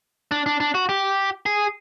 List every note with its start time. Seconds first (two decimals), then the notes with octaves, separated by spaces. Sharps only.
0.31 D4
0.46 D4
0.60 D4
0.74 F#4
0.89 G4
1.46 G#4